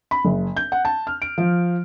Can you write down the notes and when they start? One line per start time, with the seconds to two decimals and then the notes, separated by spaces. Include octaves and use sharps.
0.11 B5
0.25 F#1
0.57 G6
0.72 F#5
0.85 A5
1.07 F6
1.22 D7
1.38 F3